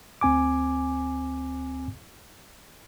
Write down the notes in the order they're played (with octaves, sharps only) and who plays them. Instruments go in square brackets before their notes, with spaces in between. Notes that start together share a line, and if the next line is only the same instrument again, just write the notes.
[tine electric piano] D2 C4 G#5 D6